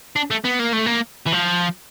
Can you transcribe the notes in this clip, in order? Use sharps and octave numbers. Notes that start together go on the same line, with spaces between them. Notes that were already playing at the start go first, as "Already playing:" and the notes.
D4
A3
B3
A#3
A3
A#3
E3
F3